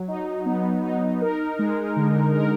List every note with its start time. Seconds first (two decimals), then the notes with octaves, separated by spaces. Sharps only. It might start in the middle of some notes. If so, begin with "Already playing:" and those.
Already playing: F#3
0.08 D#4
0.46 B3
0.84 D#4
1.21 A#4
1.59 G#3
1.97 D3
2.35 A#4